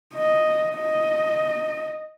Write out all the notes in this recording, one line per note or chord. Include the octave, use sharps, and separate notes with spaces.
D#5
D#5